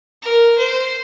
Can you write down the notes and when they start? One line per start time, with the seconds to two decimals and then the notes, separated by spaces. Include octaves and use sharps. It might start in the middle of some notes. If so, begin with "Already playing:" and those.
0.23 A#4
0.58 C5